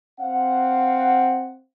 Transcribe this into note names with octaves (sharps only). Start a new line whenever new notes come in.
C4 F5 F#5